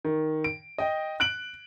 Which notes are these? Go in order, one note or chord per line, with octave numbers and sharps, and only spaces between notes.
D#3
D7
D#5 G5
F#6 D7 F#7